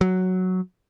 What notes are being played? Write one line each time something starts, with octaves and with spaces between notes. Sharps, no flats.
F#3